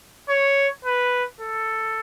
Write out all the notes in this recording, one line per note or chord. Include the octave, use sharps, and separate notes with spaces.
C#5
B4
A4